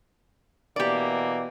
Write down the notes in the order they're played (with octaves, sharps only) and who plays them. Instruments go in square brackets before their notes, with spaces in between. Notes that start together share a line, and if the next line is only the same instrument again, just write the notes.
[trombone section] B2 E3 A#3 [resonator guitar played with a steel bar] G4 D5